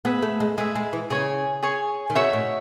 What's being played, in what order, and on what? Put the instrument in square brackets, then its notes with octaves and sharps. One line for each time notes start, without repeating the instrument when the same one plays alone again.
[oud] B3 [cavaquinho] G#4 B4 E5
[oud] A3
G#3
[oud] G#3 [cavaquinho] G#4 B4 E5
[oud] G#3
E3
[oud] C#3 [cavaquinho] G#4 C#5 G#5
[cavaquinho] G#4 C#5 G#5
[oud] D#3
[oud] C#3 [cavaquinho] D#4 F#4 C#5 E5
[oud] A2